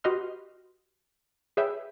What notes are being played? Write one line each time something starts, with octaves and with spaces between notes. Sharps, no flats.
F#4 G4 B4 D#5 C6 F6
G#4 B4 C#5 E5 G5